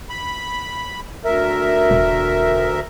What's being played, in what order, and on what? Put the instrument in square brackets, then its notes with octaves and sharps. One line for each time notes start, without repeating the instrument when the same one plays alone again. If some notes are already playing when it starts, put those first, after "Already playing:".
[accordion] B5
D2 A#4 E5
[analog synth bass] E1